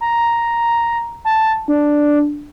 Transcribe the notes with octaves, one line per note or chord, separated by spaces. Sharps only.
A#5
A5
D4